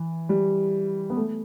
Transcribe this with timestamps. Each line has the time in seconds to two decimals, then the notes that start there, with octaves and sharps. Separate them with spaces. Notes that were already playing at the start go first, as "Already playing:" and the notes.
Already playing: E3
0.29 G3
1.10 B3
1.17 A3